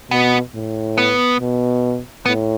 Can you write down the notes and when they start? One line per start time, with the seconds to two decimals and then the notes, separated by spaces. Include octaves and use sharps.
0.11 B2 B3
0.55 A2
0.98 B3
1.40 B2
2.26 A2 B3